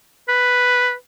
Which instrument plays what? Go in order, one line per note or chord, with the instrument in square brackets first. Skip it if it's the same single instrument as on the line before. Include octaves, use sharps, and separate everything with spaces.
[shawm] B4